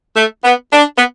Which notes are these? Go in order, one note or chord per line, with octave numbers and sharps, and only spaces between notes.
A3
B3
D4
B3